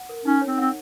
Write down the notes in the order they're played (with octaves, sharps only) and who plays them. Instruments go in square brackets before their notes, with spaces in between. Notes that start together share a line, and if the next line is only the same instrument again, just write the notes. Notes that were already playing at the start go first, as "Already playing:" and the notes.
Already playing: [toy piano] F#5
A#4
[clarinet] C#4 [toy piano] D#4
[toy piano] C#5
[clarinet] C4
[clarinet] C4 [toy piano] F#5